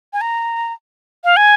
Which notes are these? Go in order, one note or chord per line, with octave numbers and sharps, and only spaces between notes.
G#5
A#5
F5
G#5